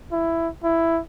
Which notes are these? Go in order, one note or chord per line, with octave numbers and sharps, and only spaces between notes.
E4
E4